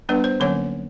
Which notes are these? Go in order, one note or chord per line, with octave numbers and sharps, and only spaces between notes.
G3 B3 D4 B4
C5
D3 F#3 A#3 C#4 C#5